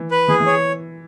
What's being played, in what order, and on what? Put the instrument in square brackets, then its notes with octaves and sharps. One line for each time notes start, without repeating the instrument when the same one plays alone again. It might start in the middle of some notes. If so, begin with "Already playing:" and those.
Already playing: [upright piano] E3
[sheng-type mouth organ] B4
[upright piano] E3 [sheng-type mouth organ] G#4
[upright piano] E3
[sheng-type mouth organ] C#5